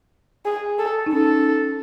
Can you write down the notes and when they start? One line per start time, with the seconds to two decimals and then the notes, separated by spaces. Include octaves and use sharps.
0.45 G#4
0.79 A4
1.06 D#4
1.12 C#4 A4